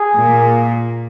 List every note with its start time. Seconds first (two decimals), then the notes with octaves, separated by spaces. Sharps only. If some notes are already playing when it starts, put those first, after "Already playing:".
Already playing: G#4
0.16 A#2